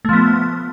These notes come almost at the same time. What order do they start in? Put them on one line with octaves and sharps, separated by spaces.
A3 F3 B3